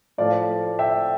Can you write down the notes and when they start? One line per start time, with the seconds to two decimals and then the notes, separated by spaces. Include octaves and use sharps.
0.18 A2 F3 D5 F5
0.79 E5 G5